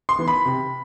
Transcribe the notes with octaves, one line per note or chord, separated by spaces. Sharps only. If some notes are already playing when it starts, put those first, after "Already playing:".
C6
E3 B3
B5
C3